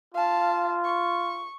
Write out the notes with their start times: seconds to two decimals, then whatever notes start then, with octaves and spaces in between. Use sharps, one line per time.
0.14 F4 F5 A5
0.84 C#6